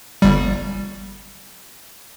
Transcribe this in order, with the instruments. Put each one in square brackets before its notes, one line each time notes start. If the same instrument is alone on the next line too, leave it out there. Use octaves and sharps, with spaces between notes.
[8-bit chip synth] G1 G3